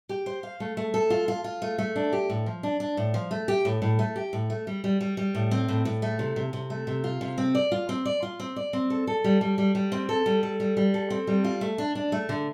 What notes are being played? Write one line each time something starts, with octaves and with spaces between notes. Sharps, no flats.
G4
C5
F5
A3
A3
A4
F4
F4
F4
A3
A3
D4
G4
A2
F3
D4
D4
A2
F3
A3
G4
A2
A2
A3
G4
A2
A3
G3
G3
G3
G3
A2
C4
A2
A2
A3
C3
C3
C3
A3
C3
F4
C3
C4
D5
F4
C4
D5
F4
C4
D5
C4
A4
A4
G3
G3
G3
G3
C4
A4
G3
A4
G3
G3
A4
C4
G3
F4
A3
D4
D4
A3
D3